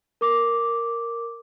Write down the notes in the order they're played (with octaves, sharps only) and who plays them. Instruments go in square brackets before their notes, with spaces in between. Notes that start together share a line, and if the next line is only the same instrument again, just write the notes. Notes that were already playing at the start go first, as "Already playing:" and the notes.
[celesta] A#4 D6